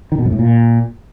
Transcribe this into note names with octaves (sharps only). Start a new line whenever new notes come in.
D#3
B2
F#2
A2
A#2